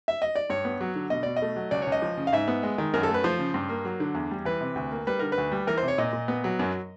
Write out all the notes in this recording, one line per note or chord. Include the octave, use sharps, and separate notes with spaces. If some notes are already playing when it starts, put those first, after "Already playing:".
E5
D#5
D5
G2 C#5
B3
F#3
D3
B2 D#5
B2 D5
D#5
A3
F#3
C#2 D5
C#5
C#2
D#5
F3
C#3
F5
G#2 E5
B3
G#3
D#3
F#2 A#4
A4
A3
B4
F3 C5
C#3
G2
A#3
F#3
D3
E2
G3
E3 B4
C3
D2
A#3
G3 B4
D3 A#4
B4
D2
G3
E3 A#4
C5
C3
C#5
A#2 D#5
A#2
B3
F#3
F#2